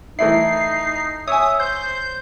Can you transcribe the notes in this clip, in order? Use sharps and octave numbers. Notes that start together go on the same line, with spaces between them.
E3 A3 D#4 E4 C7
C#5 E5 G#5 D#6
C5 G6